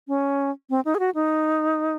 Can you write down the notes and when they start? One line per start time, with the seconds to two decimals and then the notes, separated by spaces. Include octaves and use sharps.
0.08 C#4
0.70 C4
0.85 D#4
0.95 G#4
0.99 F#4
1.15 D#4